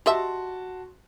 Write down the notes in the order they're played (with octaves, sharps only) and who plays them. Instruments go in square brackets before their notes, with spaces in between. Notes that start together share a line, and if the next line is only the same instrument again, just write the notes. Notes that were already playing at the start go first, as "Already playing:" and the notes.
[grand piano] F#4 A5 C6 [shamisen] G4 D#5 E5